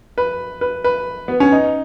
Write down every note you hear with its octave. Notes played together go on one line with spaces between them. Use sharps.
B4
B4
B4
B3
C#4
D#4